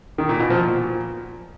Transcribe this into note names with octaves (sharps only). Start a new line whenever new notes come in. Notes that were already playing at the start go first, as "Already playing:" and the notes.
D#3
A#2
B2
F3
A#2